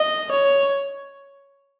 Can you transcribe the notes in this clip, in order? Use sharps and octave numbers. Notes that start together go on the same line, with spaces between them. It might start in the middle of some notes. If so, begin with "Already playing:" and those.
Already playing: D#5
C#5